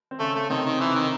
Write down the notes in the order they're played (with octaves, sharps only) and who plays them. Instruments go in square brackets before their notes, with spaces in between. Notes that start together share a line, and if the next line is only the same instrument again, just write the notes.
[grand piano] C4
[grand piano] C#3 C#4 [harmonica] A3
[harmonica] A3
[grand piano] C3 C4 [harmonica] D#3
[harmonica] D#3
E3
D#3